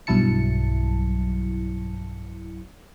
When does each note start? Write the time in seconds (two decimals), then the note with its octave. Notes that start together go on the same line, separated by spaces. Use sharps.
0.07 B1 G2 F#3 E4 A5 C#7